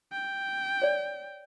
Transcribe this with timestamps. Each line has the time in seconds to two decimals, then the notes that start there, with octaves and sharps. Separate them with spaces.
0.12 G5
0.82 C#5 D5